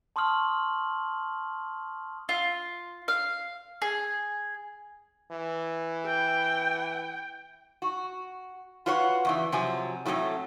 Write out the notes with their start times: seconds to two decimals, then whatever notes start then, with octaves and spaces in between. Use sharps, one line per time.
0.16 A5 C6 C#6 D#6 F6 F#7
2.29 F4
3.08 F5
3.82 G#4
5.31 E3
6.05 G5
7.82 F#4
8.86 F4 F#4 B4 C#5 F#5
9.25 E2 C#3 E3
9.52 C3 F3 F#3 G#5
10.05 A2 F#3 A3 A#3 C4